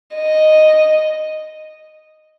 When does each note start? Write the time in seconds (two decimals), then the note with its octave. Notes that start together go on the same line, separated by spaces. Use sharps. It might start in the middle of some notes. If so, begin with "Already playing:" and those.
0.15 D#5